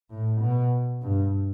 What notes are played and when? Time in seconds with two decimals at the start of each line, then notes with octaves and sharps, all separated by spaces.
0.10 A2
0.41 B2
1.02 G2